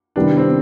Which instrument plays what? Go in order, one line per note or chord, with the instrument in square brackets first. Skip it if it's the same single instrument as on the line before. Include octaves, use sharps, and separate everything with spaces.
[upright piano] C3 D#3 G3 B3 E4 [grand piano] D4
[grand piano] C4